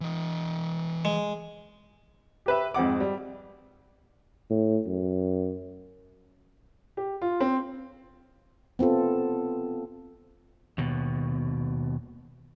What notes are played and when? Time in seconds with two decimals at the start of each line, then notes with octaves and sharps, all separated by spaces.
0.01 E3 D#5
1.05 G#3
2.46 G4 B4 E5
2.74 F2 G#2 C4 F#5 D6
3.00 G3
4.50 A2
4.86 F#2
6.97 G4
7.22 F4
7.40 C4
8.79 B3 C4 F4 A4
10.78 D#2 B2